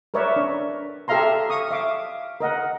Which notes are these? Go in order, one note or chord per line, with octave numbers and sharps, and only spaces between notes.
A#4 B4 C#5 D5 E5
D4
G4 A4 E5 F5 A#5 C6
C#6 D#6
E5 F5 D6
A#4 D#5 F#5